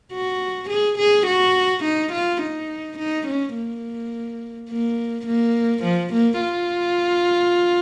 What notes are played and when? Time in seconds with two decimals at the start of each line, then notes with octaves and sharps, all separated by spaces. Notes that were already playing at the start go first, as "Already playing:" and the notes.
0.13 F#4
0.70 G#4
0.98 G#4
1.27 F#4
1.84 D#4
2.12 F4
2.42 D#4
2.98 D#4
3.27 C#4
3.55 A#3
4.70 A#3
5.26 A#3
5.83 F3
6.13 A#3
6.41 F4